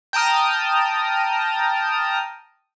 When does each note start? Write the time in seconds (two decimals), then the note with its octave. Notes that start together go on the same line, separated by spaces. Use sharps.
0.13 G5 A5 A#5 D#6 F6